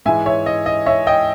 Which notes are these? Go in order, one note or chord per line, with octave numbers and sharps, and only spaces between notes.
G#2 E3 G#3 E5 G#5
C#5 E5
D#5
D#5
C#5 E5
D#5 G5